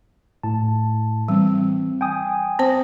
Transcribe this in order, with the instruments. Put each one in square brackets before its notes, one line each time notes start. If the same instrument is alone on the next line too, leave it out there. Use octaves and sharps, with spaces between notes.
[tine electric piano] A2 A5
[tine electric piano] E3 C4 [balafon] G3
[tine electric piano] G5 G#5 D#6
[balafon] C4 C5